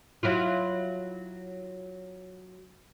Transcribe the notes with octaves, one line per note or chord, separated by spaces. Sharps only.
F#3 E4 F4